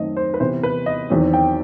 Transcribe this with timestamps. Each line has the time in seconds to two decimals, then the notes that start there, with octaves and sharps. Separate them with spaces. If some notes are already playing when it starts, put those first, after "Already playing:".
Already playing: F#2 D#3 A3 C4 D#5
0.17 C5
0.34 B4
0.40 C3 E3 B3 C5
0.63 B4
0.86 D#5
1.10 E2 D#3 F#3 C4
1.34 G5